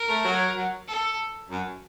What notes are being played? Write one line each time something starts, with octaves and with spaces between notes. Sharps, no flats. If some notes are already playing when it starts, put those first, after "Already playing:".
Already playing: A#4
A3
F#3
F#3
A4
F#2